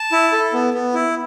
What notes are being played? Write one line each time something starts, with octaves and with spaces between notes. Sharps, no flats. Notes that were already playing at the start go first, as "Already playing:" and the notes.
Already playing: A5
E4
A4
B3
B3
E4